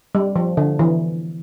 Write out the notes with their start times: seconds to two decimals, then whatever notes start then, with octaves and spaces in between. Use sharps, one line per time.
0.15 G3
0.36 F3
0.57 D3
0.79 E3